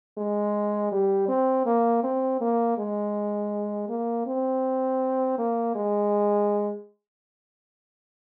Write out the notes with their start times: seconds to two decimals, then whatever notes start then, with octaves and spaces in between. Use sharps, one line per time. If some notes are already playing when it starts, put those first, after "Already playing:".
0.17 G#3
0.92 G3
1.28 C4
1.66 A#3
2.03 C4
2.41 A#3
2.78 G#3
3.89 A#3
4.26 C4
5.38 A#3
5.75 G#3